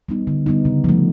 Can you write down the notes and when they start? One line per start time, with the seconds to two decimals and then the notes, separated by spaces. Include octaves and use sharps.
0.09 G3 B3 D#4
0.27 D3
0.46 G3 B3 D#4
0.65 C#3
0.84 F3 A3